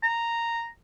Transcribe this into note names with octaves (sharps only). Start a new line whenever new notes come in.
A#5